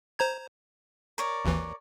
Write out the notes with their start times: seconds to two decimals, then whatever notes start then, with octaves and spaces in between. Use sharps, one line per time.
0.19 C5 A#5 G#6
1.18 A#4 C#5 D5
1.45 G#1 D#2 E3